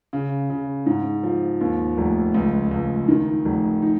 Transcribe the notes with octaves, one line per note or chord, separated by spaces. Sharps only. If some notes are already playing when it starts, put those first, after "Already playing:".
C#3
C#3
G#2
F3
D#2
F1
C#2
C#2
D#3
F1
D#4